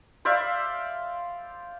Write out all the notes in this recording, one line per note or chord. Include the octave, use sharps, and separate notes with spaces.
C5 D5 E5 F5